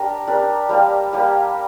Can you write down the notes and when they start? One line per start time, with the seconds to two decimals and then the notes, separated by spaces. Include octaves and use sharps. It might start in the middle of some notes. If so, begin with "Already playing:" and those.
Already playing: D4 G4 A#4
0.27 D4 G4 A#4
0.69 G3 A#3 G4
1.13 G3 A#3 G4